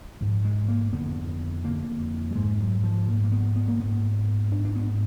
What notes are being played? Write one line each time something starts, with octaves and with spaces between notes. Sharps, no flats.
G#2 F3
G#3
A#3
F2 D3 B3
F2 D3 A#3
F#3
G#2 G#3
F#3
F3
G#2 A#3
A#3
B3
B3
A#3
G#2 B3
G#2 D4
D4
B3